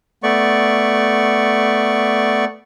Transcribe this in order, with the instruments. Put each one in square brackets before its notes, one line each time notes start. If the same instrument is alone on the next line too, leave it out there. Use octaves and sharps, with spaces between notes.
[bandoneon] A3 B3 D5 C#6